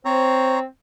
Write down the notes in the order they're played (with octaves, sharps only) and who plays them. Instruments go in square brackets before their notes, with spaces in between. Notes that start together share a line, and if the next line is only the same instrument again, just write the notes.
[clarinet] C4 [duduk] C5 [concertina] C#5 A#5